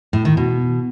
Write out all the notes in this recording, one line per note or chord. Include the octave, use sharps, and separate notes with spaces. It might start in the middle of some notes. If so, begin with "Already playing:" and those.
A2
D#3
B2